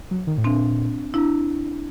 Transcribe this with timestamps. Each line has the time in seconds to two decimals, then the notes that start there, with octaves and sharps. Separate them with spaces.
0.11 F#3
0.27 D#3
0.38 A2
0.44 A#2 C4 D4
1.14 D4 E4